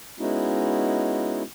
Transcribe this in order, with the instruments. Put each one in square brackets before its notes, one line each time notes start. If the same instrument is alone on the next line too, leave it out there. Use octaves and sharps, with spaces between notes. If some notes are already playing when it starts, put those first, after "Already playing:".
[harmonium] G#3 B3 C#4 D#4 E4 F#4